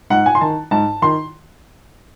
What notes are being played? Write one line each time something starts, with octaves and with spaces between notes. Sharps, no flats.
G#2 F#5
G#5
C6
D#3 A5
G#2 A5
D#3 C6